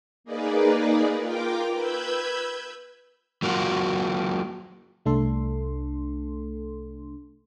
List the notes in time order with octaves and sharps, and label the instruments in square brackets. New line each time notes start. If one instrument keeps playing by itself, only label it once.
[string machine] A#3 D#4 G#4 B4 D5
F4 A#4 G5 D6
B4 B5 E6 G6 G#6
[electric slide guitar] F#3 A#3 F4 F#4
[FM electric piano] C2 A3 D4 A4 C6